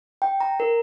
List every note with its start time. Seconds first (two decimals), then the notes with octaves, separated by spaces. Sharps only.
0.22 G5
0.41 A#5
0.60 A#4